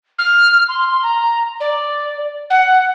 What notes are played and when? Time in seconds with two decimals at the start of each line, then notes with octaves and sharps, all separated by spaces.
0.19 F6
0.68 C6
1.03 A#5
1.60 D5
2.50 F#5